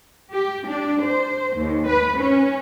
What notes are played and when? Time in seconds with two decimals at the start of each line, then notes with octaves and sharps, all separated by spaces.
0.32 G4
0.65 D4
1.05 C5
1.56 D#2
1.86 B4
2.17 C#4